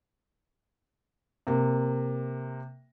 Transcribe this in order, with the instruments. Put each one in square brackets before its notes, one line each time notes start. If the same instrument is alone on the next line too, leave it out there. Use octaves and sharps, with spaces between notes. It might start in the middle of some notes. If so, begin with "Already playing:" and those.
[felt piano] C3 A#3